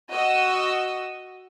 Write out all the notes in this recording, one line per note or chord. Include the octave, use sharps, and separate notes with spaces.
F#4 D#5 E6